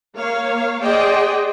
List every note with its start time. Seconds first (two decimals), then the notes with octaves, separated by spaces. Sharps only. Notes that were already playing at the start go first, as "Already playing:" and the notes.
0.16 A#3 C#5 F5
0.82 G#4 C5 D5 D#5 G5